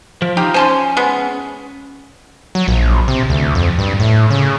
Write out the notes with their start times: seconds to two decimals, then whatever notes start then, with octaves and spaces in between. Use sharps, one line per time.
0.22 F3
0.37 D#4 F4 G4
0.54 C#4 C5 G#5 A5 C6
0.97 G#3 B3
2.55 F#3
2.68 A#1
3.08 C3
3.30 D2
3.55 F2
3.78 G2
4.00 A2
4.30 C#3